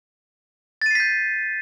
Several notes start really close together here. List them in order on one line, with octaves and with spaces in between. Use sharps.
A6 D#7 C7 B6 G6